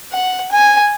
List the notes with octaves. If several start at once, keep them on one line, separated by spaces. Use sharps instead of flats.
F#5
G#5